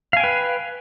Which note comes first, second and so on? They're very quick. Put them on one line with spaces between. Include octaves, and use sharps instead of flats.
F5 G#5 G5 B4